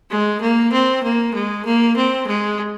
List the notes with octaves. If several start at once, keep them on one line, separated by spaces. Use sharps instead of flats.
G#3
A#3
C4
A#3
G#3
A#3
C4
G#3